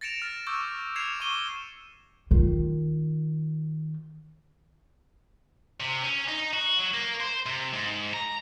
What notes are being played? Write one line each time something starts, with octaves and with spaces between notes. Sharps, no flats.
A6 A#6 C#7 D7 E7 F7
F6 A6
C#6 D6 E6 G6
F6 G#6 C7 C#7 E7 F7
C#6 D6 D#7 G7
D#3 F4
C3
C#4
D#4
F#4
F#3
A#3
C5
C3
G#2
A#5